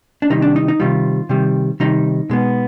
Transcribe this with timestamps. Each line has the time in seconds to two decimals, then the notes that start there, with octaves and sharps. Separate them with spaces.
0.22 D4
0.30 C3 D#3 G3 D#4
0.42 D4
0.56 D#4
0.68 D#4
0.80 C3 D#3 G3 F4
1.29 C3 D#3 G3
1.80 C3 D#3 G3 D#4
2.30 B2 G#3 B3